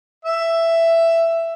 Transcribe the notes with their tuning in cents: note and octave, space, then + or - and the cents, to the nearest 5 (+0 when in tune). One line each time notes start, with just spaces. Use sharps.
E5 +10